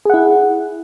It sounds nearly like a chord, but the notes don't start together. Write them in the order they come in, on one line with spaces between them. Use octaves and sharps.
G#4 F#5 E4